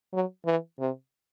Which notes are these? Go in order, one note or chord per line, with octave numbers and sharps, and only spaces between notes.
F#3
E3
C3